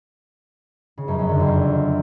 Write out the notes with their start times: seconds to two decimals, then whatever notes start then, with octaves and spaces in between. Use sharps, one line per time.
0.98 C#3
1.08 F#2
1.19 F#2
1.29 D3
1.40 F2